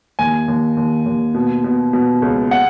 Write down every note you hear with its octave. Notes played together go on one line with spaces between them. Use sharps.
D#2 G#5
D#2
D#2
D#2
B2
B2
B2
C#2
F#5